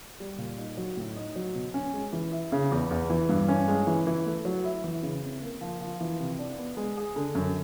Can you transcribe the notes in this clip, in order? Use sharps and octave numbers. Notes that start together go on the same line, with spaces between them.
G3
A#2
D#4
F#3
A2
D#4
F#3
B2
C#4
G#3
E3
E4
C#3
E2
E2
E3
G2
C#4
G#3
E3
E3
A3
F#3
E4
E3
C#3
C4
A#3
F3
F3
E3
C3
D4
B3
G#3
G#4
D3
F#2